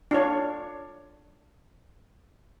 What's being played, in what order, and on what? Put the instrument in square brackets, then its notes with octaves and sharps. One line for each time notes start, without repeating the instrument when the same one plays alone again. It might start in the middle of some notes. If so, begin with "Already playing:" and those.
[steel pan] D4 F4 C#5